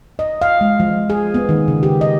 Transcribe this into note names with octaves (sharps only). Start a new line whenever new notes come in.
D#5
F5
G#3
F3
G#4
B3
D#3
C#3
G4
D#5